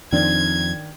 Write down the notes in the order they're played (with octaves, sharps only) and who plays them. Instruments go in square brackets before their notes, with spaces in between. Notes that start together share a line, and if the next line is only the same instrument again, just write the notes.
[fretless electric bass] F2 F3 C4 [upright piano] D#3 D4 [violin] G#6